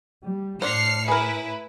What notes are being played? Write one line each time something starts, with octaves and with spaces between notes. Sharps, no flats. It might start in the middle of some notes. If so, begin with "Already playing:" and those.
G3
A2 D4 C5 F6 C7 C#7
E4 G#4 A#4 B4